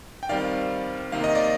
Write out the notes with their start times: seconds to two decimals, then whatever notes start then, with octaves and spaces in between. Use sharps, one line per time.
0.23 G5
0.29 D#3 G3 C4 D5 F5
1.12 C3 D#3 A#3 F5
1.24 D#5
1.35 D5